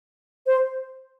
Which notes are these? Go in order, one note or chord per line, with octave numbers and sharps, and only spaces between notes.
C5